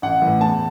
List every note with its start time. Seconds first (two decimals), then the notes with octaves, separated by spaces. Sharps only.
0.02 A1 F#5
0.22 A2 E3
0.41 E2 A5